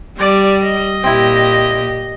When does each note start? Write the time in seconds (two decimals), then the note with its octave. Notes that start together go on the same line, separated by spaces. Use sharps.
0.18 G3 D5
0.62 D#5
1.04 A#2 C4 E4 G4